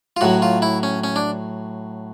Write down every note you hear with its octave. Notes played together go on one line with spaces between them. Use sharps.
F4
A2 F#3 F#4
F4
E4
C#4
C#4
D4